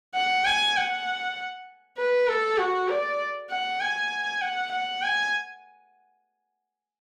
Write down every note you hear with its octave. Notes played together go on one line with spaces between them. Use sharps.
F#5
G#5
F#5
B4
A4
F#4
D5
F#5
G#5
F#5
F#5
G#5